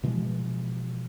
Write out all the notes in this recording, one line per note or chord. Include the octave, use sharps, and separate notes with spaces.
B2 E3 F3 G#3